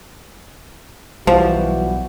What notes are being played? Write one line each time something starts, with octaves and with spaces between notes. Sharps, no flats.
B1 E3 F3 G3 F#4